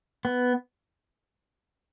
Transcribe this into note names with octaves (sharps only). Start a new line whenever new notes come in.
B3